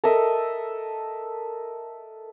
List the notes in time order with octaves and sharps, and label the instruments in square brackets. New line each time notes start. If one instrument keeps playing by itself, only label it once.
[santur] A4 A#4 D#5 E5